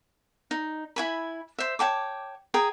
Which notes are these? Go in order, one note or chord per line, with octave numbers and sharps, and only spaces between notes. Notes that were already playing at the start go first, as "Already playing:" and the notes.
D#4
E4 G#5 B5
C5 E5
C#5 G5 A5 D6
G#4 G5 A#5 D#6